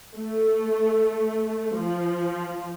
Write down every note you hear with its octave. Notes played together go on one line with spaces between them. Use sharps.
A3
F3